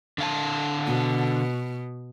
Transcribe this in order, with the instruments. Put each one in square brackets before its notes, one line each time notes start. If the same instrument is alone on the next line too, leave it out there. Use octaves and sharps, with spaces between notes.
[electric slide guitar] D3 F5 A5
[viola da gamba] B2